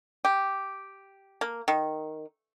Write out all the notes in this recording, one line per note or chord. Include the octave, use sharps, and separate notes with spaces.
G4
A#3
D#3